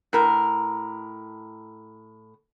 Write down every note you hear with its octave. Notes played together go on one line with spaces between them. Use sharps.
A2 A#4